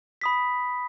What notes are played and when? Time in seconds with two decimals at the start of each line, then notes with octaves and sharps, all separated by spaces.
0.21 B5 D#6 B6